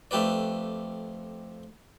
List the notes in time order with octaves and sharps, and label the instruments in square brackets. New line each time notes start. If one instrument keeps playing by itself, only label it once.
[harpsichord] F2 A3 G4 B4 D5